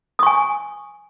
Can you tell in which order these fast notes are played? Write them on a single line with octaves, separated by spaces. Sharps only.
D#6 C#6 G#5